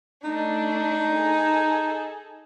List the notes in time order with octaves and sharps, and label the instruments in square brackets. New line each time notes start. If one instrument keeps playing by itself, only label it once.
[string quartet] A3 D4 [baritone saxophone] D#4
[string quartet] G#4 A4